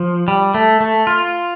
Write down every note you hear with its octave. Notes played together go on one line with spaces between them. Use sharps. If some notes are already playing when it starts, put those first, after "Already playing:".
Already playing: F3
G3
A3
A3
F4